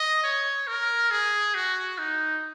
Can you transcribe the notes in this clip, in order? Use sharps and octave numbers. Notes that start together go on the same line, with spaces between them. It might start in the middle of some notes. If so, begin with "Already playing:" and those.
Already playing: D#5
C#5
A#4
G#4
F#4
D#4